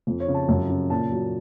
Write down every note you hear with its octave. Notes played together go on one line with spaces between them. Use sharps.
F2
C#5
C#3
A5
F#2 A5
C#3
A#2 A5
F#3